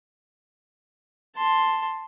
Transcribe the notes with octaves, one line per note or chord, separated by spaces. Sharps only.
A5 C6